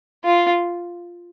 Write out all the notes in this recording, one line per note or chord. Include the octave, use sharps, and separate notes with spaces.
F4